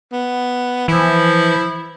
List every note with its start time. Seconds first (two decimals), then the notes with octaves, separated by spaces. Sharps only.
0.12 B3
0.88 E3 F3 E4